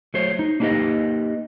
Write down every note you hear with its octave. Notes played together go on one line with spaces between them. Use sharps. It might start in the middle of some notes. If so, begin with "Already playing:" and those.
F#3 A3 C5 C#5
D#4
A#3 D4 D#4 G4 B4 D#5